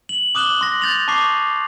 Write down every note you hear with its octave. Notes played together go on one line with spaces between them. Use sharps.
F#7
D6 D#6 F#6 E7 F#7 G7
C6 A#6
G6 A6 F7
A5 C#6 D6 C7